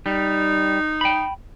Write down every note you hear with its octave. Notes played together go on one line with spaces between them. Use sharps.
G3 D#4
G5 B5